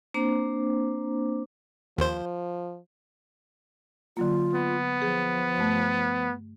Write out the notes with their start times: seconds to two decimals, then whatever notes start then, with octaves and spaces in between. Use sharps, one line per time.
0.14 A#3 C4 D4 C5 A#5 D6
1.98 D#2 F3 C5
4.17 D3 F#3 A#3 F4
4.53 B3
5.02 F3 G#4
5.58 G2 A3